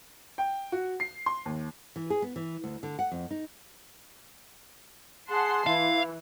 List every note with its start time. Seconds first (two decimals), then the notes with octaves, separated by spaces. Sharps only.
0.38 G5
0.72 F#4
1.00 C7
1.26 C6
1.46 D#2
1.96 E3
2.10 G#4
2.22 B3
2.36 E3
2.64 D2
2.83 D3
2.99 F#5
3.12 F2
3.31 D#4
5.29 G#4 F#5 A5 C6
5.67 E3 E4 F5